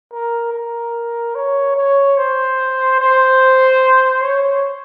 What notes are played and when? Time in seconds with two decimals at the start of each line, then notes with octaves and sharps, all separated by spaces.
0.12 A#4
0.53 A#4
1.35 C#5
1.76 C#5
2.17 C5
3.00 C5
4.22 C#5